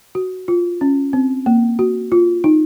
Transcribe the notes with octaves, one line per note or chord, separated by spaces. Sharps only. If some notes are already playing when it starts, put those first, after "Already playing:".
F#4
F4
C#4
C4
A#3
F#4
F4
D#4